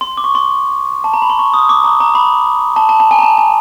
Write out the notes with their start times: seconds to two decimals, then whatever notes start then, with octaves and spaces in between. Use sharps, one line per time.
0.01 C6
0.17 D6
0.24 C#6
0.35 C6
1.04 A5
1.14 A#5
1.22 B5
1.30 C6
1.39 C#6
1.54 D#6
1.69 D6
1.84 A#5
2.00 A#5
2.15 B5
2.76 A5
2.89 A5
3.00 A5
3.11 G#5
3.18 A#5
3.22 A5
3.38 G#5